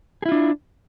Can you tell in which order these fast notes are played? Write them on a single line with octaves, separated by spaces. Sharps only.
G#4 E4 F4 D4